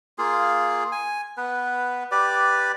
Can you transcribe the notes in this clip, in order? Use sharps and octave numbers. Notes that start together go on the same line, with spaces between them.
A#3 F4 G#4
G#5
B3 B4
G4 B4 D5